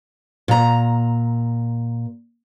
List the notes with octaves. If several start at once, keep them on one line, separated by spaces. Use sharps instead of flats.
A#2 A#5